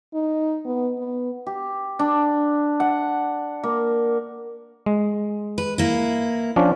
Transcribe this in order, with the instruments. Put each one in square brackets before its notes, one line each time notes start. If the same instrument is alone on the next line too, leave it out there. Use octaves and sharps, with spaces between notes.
[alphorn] D#4
B3
B3
[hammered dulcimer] G4
D4
F#5
A#3
[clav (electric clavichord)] G#3
[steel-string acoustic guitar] B4
A#3 E4
[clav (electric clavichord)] F3 C#4 D4